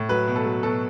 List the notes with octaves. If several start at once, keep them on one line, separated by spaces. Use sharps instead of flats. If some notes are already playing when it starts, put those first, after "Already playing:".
Already playing: A2
F#3 B4
B2
A4
F#3
B2 A4